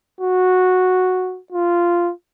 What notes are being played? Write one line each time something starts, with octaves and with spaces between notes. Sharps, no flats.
F#4
F4